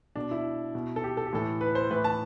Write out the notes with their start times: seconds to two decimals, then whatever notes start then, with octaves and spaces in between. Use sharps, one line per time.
0.16 B2 D4
0.31 E4
0.75 B2
0.96 A4
1.04 G4
1.17 A4
1.26 G4
1.33 A2 E3 A4
1.61 B4
1.75 C5
1.91 A2 E3 B4
2.04 A5